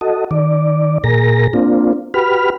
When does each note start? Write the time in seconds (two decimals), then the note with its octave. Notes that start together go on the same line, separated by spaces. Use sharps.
0.01 F#4 A4 D#5
0.31 D#3 D5
1.04 A#2 G#4 A#4 A#6
1.53 A#3 C4 D4 F4
2.14 F#4 G4 B4 B5 F6